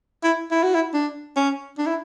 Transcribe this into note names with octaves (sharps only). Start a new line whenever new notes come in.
E4
E4
F#4
E4
D4
C#4
D4
E4